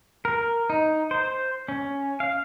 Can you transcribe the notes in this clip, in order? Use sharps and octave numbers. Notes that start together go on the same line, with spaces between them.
A#4
D#4
C5
C#4
F5